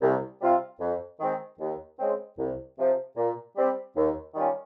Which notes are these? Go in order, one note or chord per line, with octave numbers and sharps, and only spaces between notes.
C2
C3 G3 C4 F4
F2
D#3 G#3 C4
D#2
C#3 G#3 C4
C2
C3 F3
A#2
G3 C4
D#2
D#3 G3 C#4 F4